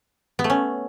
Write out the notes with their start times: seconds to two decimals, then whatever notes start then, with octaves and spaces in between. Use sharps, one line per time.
0.39 B3
0.44 A3
0.50 C#4